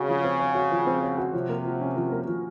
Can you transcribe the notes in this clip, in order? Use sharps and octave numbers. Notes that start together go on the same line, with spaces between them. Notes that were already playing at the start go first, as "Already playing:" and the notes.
Already playing: C#3 C4 F#4 C#5
F3
C4
C#5
F#4
F3
C4
C#5
F#4
C3 F3
A#3
F3
C#4
F3
A#3
F3